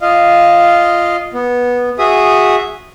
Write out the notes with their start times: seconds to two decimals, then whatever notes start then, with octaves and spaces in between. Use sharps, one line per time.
0.01 F4 D#5 F5
1.33 B3
1.99 F#4 G#4 E5 D#6